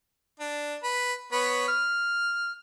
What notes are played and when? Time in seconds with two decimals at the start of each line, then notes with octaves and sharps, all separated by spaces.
0.40 D4
0.83 B4
1.32 B3 B4 C#5
1.68 F6